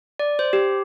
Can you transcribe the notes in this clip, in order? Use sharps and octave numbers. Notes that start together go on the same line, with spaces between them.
D5
C5
G4